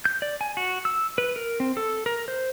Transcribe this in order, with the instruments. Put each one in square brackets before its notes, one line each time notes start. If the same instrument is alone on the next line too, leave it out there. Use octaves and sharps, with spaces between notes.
[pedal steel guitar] G6
D5
G#5
F#4
E6
B4
A#4
C4
A4
A#4
C5